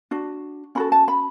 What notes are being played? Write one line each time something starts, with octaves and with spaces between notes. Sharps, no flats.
D4 F#4
C#4 F#4 A4 B5
A5
B5